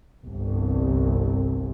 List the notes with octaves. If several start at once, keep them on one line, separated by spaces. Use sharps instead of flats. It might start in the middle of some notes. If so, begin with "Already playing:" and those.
G1 C2